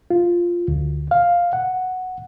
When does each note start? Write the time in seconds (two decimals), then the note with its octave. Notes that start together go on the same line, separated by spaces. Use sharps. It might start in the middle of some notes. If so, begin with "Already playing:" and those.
0.10 F4
0.68 D2
1.11 F5
1.53 F#5